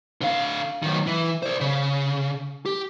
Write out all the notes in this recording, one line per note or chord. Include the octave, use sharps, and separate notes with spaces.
D3 F5
F#2 D#3
E3
C5 D5
C#3
G4